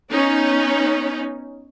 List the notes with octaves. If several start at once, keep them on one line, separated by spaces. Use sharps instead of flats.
B3 C#4 D#4